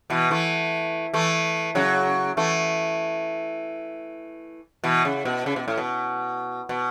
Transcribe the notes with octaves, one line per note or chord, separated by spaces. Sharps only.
B2 E3
E3 A3
E3 A3
C#3 F#3
E3 A3
B2 E3
C#3
B2
C#3
B2
A2
B2
B2